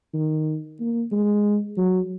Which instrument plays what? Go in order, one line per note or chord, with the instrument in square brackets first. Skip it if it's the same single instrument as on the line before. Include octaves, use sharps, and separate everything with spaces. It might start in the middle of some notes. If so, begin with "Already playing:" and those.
[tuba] D#3
A#3
G#3
F#3